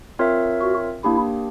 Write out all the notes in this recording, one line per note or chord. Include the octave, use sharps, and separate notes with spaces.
C4 F4 A#4 C#5 E5
F#4
A#3 D4 E4 G4